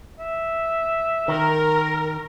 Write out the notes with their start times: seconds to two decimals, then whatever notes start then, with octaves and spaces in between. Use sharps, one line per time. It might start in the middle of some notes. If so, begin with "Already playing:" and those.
0.19 E5
1.28 D#3 A#4